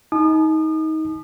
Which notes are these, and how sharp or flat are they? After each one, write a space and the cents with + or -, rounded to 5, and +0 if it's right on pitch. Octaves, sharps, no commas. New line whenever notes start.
D#4 +25 A5 -40 D#6 -40